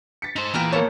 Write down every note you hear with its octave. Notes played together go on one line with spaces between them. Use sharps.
A6 B6 C#7
D#4 A4 C5
E2 A#2 E3 A#4 F5 G5
A#3 A4 C5 C#5